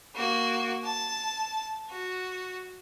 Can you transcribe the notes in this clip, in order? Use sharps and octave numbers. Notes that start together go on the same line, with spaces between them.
A#3 F#4
A5
F#4